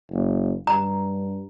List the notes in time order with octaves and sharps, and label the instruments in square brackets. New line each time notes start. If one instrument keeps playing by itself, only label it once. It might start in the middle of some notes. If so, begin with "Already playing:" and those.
[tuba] F#1
[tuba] G2 [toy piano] A#5